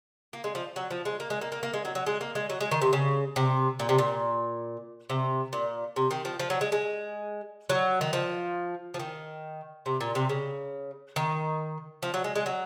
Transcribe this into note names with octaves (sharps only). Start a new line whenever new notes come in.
A#3
G#3
F3
F#3
F3
G#3
A#3
G#3
A#3
A#3
A#3
G#3
F#3
F#3
G#3
A#3
G#3
F#3
G#3
D#3
C3
C#3
C3
A#2
C3
A#2
C3
A#2
C3
D#3
F3
F3
F#3
G#3
G#3
F#3
D#3
F3
F3
D#3
C3
A#2
C3
C#3
D#3
F3
F#3
G#3
G#3
F#3